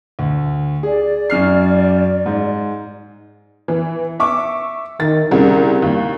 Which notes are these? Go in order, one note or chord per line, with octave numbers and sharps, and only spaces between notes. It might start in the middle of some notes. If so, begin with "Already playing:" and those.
D2
G#4 D5
F#2 F6 C7
G#2
E3
E5 C#6 D6
D#3 A6
C2 C#3 G3 A#4
D#2